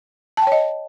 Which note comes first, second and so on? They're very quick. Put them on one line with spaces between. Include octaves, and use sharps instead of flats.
A5 G5 C#5 D#5